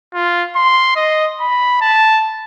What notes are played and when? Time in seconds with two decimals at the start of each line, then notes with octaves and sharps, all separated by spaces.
0.14 F4
0.56 C6
0.96 D#5
1.40 B5
1.81 A5